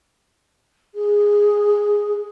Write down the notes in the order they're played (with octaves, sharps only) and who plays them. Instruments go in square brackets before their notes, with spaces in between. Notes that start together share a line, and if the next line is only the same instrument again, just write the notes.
[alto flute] G#4